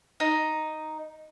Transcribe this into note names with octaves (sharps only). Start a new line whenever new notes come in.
D#4